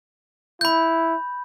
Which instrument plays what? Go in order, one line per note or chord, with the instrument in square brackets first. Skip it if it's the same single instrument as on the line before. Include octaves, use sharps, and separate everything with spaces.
[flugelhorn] E4 [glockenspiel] B5 G6